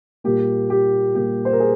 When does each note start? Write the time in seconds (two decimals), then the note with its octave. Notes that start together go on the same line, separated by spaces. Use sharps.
0.24 A#2 G3 A#3 G4
0.70 G4
1.15 A#2 G3 A#3 G4
1.45 C5
1.53 A#4
1.60 G#4